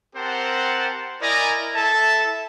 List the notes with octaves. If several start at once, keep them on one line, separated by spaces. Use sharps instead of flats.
C4 G4 A#4 C5 F#5 A5
E4 A#4 D5 D#5 G#5 A#5
E4 A4 E5 A5